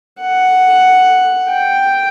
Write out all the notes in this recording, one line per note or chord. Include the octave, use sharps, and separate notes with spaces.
F#5
G5